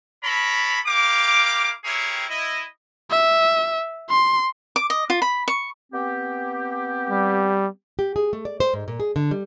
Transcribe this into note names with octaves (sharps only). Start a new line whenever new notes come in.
A4 A#4 C#5 A#5 B5
E4 G4 A#4 F5 D6
C4 E4 G4 G#4 A#4 C#5
E4 D#5
E5
C6
D6
D#5
F4
B5
C#6
B3 C4 G4
G3
G4
G#4
A3
D5
C5
G#2
A#2
G#4
D3
G3